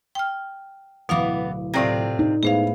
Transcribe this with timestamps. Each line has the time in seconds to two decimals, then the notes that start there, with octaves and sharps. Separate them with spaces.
0.15 G5 F6
1.09 D1 B2 E3 B3 E4 F5 D6
1.74 A2 C3 C4 F4 D5 A#6
2.19 D#4
2.43 A2 G#3 B3 G#4 C5 F5